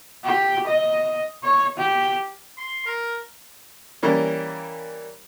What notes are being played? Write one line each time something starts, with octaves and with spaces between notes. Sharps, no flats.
G4
D#5
C#5
G4
C6
A#4
E3 G3 A#3 C#4